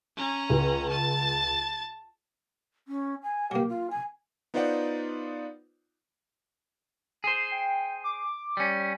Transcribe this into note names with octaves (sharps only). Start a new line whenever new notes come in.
C#4 A#5
C#2
A5 A6
C#4
G#5
F#3 A#3 G4
F4
G#5
B3 D#4 F4 C5 D5 F#5
G#4 C5
G5
D6
G3 C#4